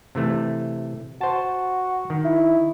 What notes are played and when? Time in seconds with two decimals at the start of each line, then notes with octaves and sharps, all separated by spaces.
0.15 C3 E3 A3
1.21 F#4 C5 A5
2.10 D#3
2.25 E4